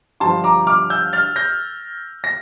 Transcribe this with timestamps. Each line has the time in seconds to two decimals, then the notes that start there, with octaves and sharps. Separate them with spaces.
0.20 G2 D3 F3 A5 C6
0.44 A#5 D6
0.67 D6 F6
0.90 E6 G6
1.13 F6 A6
1.36 G6 A#6
2.24 A#6